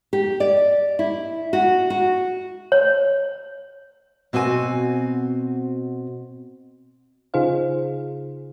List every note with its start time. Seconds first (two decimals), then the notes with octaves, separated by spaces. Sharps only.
0.13 G4
0.40 D5
0.99 E4
1.53 F#4
1.90 F#4
2.72 C#5
4.33 B2 C4 F#4 D5 G#5
7.34 C#3 D#4 F4 G#4 C5 F5